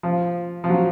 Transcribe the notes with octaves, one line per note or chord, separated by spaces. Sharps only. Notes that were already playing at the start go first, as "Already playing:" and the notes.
F3
F3
F#3